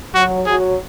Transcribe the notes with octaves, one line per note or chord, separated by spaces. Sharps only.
F#3 F#4
F#3 G#4